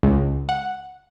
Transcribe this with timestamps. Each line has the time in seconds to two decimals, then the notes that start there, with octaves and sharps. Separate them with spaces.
0.03 C#2
0.49 F#5